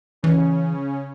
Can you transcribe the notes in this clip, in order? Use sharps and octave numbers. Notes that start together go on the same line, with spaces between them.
C#3 E3 C#4